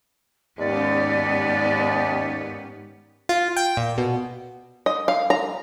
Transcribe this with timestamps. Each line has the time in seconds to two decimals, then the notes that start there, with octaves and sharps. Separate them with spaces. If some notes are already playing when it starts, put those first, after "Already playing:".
0.59 D#2 G#2 B3 C#4 D#4 G4 D5
3.29 F4
3.57 G5
3.77 A#2
3.98 B2
4.86 D#5
5.08 F5
5.30 A#5